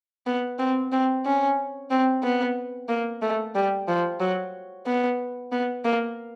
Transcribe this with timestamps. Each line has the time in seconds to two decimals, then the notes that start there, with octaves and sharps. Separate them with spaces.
0.26 B3
0.59 C4
0.92 C4
1.25 C#4
1.90 C4
2.23 B3
2.88 A#3
3.21 A3
3.55 G3
3.88 F3
4.20 F#3
4.86 B3
5.52 B3
5.84 A#3